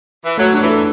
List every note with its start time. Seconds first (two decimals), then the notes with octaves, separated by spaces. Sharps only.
0.25 E3
0.37 F#3 A3
0.53 F#3 D4
0.61 E3
0.69 A4